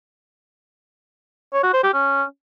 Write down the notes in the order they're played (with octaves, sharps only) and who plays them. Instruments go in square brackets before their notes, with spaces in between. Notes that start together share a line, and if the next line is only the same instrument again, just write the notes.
[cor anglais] C#5
F#4
C5
G4
C#4